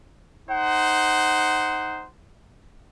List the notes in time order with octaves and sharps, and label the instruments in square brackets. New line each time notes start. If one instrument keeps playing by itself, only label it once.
[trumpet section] D#4 C5 F#5